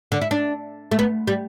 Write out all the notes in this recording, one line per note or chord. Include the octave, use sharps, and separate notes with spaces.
D3
E4
D4
A3
B3
G3